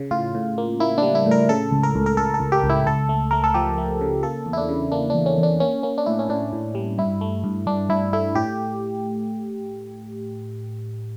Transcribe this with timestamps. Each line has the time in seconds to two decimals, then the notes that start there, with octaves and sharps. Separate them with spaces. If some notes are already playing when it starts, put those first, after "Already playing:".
Already playing: C#3
0.11 A2 F4
0.35 A2
0.58 A#3
0.80 A#3 E4
0.98 G3 D4
1.15 E4
1.26 A2
1.31 A#4
1.49 C#3 A4
1.71 C#2
1.83 A#4
1.95 C#2
2.06 A#4
2.17 C#2 A4
2.34 A4
2.40 C#2
2.52 G4
2.63 C#2
2.70 E4
2.87 C#2 A4
3.09 A3
3.31 A3 A#4
3.44 A4
3.54 F3 G4
3.78 A3
4.01 C#3
4.23 A#3 A4
4.46 E2
4.53 E4
4.58 D4
4.69 C#3
4.92 A#3 D4
5.10 E2 D4
5.26 C#4
5.38 E2
5.43 D4
5.60 A#3 C#4
5.83 A#3 C#4
5.98 D4
6.06 A2 E4
6.19 C#4
6.29 A2 D4
6.53 A2
6.75 G3
6.98 G2 E4
7.21 A3
7.44 G2
7.67 G2 D4
7.89 G2 E4
8.13 A3 E4
8.35 A2 G4